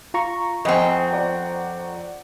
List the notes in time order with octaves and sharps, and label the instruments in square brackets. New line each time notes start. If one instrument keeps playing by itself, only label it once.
[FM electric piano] F4 A#5 C#6
[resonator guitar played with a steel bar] F2 C4 [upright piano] D#5 F#5 G#5
[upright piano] D5 F#5